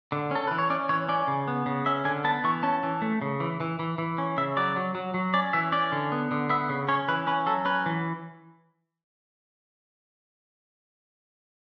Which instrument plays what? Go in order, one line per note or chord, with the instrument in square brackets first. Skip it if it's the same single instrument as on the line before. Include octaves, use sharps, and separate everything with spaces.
[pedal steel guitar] D3
C#4 A4
E3 B4
C#5
C#4 D5
E3 C#5
C#4 D5
C#3
B3
C#3
C#4 E5
D3 G#5
B3 A5
E3 C#6
C#4 A5
E3
A3
C#3
E3
E3
E3
E3
C#4
C#3 E5
F#3 D5
F#3
F#3
F#3
C#4 D5
E3 E5
C#4 D5
D3
B3
D3
B3 E5
C#3
C#4 C#5
E3 B4
C#4 B4
F#3 A4
C#4 B4
E3